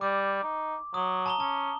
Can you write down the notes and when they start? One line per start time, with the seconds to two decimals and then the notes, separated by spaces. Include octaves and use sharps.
0.01 G3 D6
0.43 D#4
0.94 F#3 D#6
1.26 A5 A#5 G7
1.40 C#4 A5